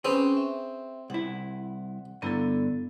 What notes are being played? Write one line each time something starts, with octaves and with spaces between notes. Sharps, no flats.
C4 C#4 G#4 B4 G5
E5
C2 E4 F#5
G2 D3 B3 E4 A4 A#5